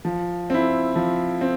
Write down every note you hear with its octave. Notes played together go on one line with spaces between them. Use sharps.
F3
C4 E4
F3
C4